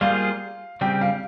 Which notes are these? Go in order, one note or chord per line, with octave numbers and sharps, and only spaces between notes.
G3 A#3 F4 G#4 C5 F5
C#3 G3 C4 G4 G5
F5